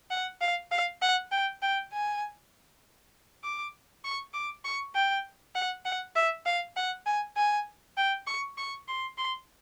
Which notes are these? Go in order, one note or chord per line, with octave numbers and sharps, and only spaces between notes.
F#5
F5
F5
F#5
G5
G5
G#5
D6
C#6
D6
C#6
G5
F#5
F#5
E5
F5
F#5
G#5
G#5
G5
C#6
C#6
C6
C6